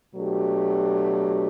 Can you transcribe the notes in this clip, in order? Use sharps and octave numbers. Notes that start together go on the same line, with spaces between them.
B2 F#3 A3 D4 G4